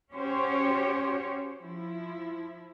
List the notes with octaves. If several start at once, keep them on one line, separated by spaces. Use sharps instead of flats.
C#4 F#4 G4 C5 C#5
F3 E4